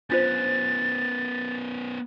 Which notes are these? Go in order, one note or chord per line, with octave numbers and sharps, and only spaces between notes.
B3 C#4 D4 F4 C5 A6